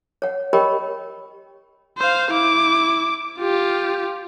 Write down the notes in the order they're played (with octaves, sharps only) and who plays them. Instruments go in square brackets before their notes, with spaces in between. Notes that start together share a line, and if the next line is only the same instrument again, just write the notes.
[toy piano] C#5 F#5
G4 A#4 C#5 D#5 G5 B5
[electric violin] C5 F5
E4 D6
F4 G4